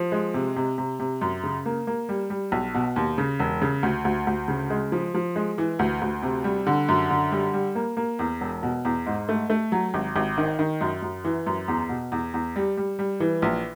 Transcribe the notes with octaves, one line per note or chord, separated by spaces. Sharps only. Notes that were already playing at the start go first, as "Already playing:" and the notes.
Already playing: F3
G#3
C3
C3
C3
C3
F#2
C#3
A#3
A#3
G3
G3
B1
B2
D#2
C#3
E1
C#3
D2
D2
D2
C#3
G#3
F3
F3
G#3
E3
D2
D2
C3
G3
D3
F#2
D3
G3
G3
A#3
A#3
E2
E1
B2
E2
G#2
A3
A3
F#3
G#1
G#1
D#3
D#3
F#2
F#2
E3
F#2
E2
B2
E2
E2
G3
G3
G3
E3
A#1